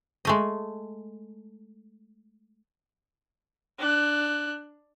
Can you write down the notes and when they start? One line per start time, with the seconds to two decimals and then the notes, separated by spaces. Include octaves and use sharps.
0.25 G#3 A3 D#5
3.78 D4 F#6